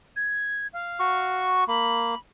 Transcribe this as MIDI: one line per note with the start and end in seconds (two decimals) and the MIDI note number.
0.16 0.67 92
0.73 1.52 77
1.00 1.64 66
1.00 1.64 85
1.68 2.15 58
1.68 2.18 83